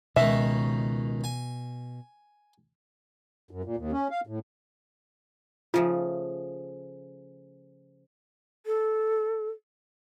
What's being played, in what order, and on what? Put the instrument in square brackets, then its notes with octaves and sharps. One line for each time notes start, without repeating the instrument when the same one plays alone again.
[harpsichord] C#2 D#3 C#4 [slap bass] B2 [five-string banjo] E5
[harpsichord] G#5
[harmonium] F#2
A#2
D#2
C#4
F5
A2
[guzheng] C#3 F3 A3 [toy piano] F4
[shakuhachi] A4